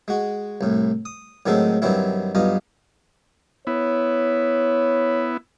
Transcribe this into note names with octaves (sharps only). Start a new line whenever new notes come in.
G#3 F#4
C2 A2
D#6
A2 D#3 F#3 G#3 C4 A4
G2 D#3 F#3 C4 E4
B1 G2 F4 D#5
B3 E4 C#5